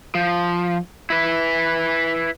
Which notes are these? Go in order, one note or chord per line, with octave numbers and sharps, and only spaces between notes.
F3
E4 B4